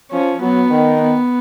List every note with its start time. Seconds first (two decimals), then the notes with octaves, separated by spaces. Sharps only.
0.11 F3 C#4
0.41 F#3 B3
0.70 D#3
1.00 B3